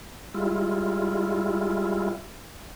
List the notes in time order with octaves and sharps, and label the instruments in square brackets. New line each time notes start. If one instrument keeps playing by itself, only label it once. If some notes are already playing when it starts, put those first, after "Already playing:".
[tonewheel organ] G3 G#3 E4 F4